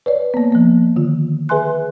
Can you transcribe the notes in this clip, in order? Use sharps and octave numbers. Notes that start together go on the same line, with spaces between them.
B4 C#5 D5
A#3 B3
F3 A#3
D3 D#3 F4
G#4 B4 E5 G#5 C6 F#6